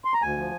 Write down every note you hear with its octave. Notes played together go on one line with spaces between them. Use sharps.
C6
A#5
D2 G#5
F3